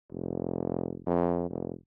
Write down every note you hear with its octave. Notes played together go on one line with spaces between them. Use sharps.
F1
F2
F1